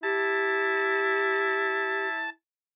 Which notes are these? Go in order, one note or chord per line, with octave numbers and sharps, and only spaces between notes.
E4 G4 A5